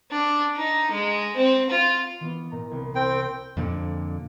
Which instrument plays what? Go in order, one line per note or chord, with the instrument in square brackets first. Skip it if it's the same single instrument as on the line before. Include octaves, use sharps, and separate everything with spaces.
[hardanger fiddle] D4
D#4
G#3
C4
F4
[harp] E3 B3 F4
A#2 A#5
C2
[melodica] C4 G5
[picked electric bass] F2 A#2 D3